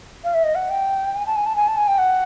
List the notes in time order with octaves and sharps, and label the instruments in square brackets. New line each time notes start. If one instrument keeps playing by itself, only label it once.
[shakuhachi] F5
E5
D#5
F#5
G5
G#5
A5
G#5
A5
G#5
A5
G#5
G5
F#5